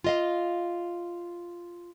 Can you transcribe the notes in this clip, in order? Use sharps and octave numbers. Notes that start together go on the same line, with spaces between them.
F4 D#5 F5